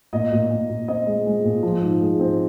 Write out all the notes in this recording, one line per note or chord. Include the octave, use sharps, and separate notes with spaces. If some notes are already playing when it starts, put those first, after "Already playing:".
A#2 D#5
A#2
A#2
A#2
C4 D#5
G#3
G#3
A#2
F3
G#2
G#3
C4